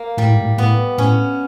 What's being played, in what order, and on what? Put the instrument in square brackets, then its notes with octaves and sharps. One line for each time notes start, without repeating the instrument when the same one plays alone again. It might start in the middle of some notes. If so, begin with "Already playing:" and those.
Already playing: [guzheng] A#3
[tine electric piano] A2 [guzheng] G3
[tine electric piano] G#2
A2
[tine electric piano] A2 [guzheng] B3
[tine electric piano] A2 [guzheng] C#4